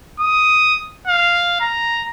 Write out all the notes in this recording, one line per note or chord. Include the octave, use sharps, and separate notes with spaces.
D#6
F5
A#5